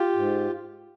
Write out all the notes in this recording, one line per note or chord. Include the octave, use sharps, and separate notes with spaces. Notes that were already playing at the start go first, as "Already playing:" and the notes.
Already playing: F4 G4
G#2